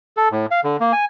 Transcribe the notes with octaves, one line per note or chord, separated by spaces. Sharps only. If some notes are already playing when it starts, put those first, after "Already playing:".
A4
A2
F5
D3
A#3
G#5